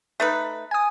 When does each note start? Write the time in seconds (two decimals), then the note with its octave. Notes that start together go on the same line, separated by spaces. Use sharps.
0.20 A3 D#4 B4
0.71 G#5 D#6